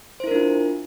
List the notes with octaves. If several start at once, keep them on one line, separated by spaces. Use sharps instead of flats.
D4 E4 F4 A#4 C5